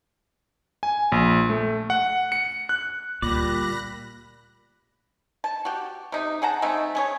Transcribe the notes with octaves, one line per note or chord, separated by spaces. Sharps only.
G#5
A#1
A3
F#5
C#7
F#6
D2 A#2 G3 D5 B5 F#6 A#6
A5
F#4 G4
C3 D#4
G#4 F#5 A5 A#5
G#3 A3 C4 D#4
C#4 G#4 C#5